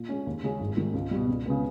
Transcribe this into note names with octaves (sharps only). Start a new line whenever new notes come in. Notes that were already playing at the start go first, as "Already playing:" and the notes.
Already playing: A#2
G#3 C#4
D#2
C#3 G#3 C#4
G#1
G#2 D#3 G3
C#2
B2 G3
C#2
C#3 G#3 B3